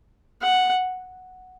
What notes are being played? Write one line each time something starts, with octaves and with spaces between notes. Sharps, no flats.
F#5